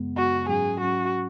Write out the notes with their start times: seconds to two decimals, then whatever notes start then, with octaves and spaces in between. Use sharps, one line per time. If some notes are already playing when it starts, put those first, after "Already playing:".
Already playing: F#2 C#3 G#3 B3
0.16 F#2 C#3 G#3 B3 F#4
0.49 G#2 F#3 C#4 G#4
0.80 G#2 F#3 C#4 F#4